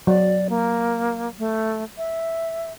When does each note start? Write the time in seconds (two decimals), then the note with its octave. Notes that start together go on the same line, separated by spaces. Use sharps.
0.07 F#3 D5
0.50 A#3
1.39 A3
1.98 E5